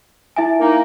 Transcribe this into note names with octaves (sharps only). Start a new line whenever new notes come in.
E4 E5 G#5
A#3 D#4